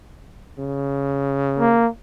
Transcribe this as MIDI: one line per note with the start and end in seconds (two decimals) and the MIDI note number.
0.59 1.87 49
1.59 1.89 58